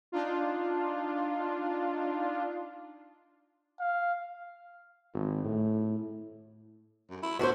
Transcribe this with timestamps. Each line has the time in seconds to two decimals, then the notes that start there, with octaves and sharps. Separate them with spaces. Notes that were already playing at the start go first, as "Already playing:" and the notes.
0.12 D4 D#4 F4
3.80 F5
5.14 G#1
5.44 A2
7.10 F#2
7.23 E4
7.39 D2 B3 F#4 C5